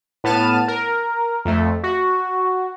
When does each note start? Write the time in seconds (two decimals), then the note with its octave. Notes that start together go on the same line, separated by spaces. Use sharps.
0.24 A2 B3 A5 F6 D#7
0.68 A#4
1.45 F2 A3
1.83 F#4